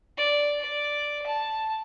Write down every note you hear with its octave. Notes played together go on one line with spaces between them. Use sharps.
D5
D5
A5